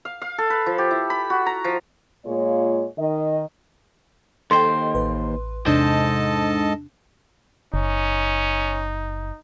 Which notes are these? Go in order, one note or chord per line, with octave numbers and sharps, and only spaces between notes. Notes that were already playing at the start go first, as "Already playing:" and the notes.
F5
F5
A4
B4
F3
G4
E4
B5
F#4
A#5
F3
A#2 G#3 A#3 F4 C#5
D#3 D#5
D#2 A4 C5 D#5 G5 C6
A1 B4
E2 G#2 C3 D4 A4 C5 D#5 A5
F#1 C#4 D#4